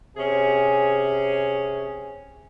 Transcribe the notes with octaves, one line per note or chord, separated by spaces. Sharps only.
C3 C#4 G#4 G#5